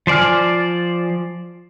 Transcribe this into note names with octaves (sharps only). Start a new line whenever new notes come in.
F3 C5 D5 G#5 F6